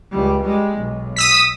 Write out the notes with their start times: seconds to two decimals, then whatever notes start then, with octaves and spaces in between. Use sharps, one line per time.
0.11 C#2 G3
0.42 G3 G#3
0.78 B1
1.16 D#6 E6 B6